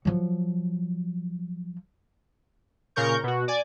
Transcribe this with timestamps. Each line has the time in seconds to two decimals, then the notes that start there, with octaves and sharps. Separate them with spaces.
0.05 F3 F#3
2.96 A#2 C#3 A#4 C#6 G6
3.23 B2 F#4
3.48 D5 G#5